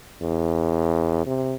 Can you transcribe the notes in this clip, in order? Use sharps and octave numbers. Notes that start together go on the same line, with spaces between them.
E2
C3